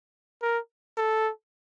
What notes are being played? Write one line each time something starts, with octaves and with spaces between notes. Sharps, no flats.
A#4
A4